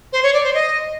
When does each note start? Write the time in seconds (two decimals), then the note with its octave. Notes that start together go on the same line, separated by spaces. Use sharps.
0.12 C5
0.23 C#5
0.33 D5
0.43 C5
0.54 D#5